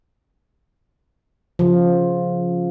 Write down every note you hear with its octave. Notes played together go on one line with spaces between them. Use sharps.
C#3 F3